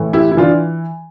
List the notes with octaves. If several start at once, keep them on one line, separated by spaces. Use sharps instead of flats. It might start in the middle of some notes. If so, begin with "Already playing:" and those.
Already playing: A2 E3
E4 G4
E4
E3 D4 F4